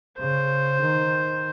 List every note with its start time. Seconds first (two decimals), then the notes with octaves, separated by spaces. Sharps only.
0.18 C#3 C5
0.81 D#3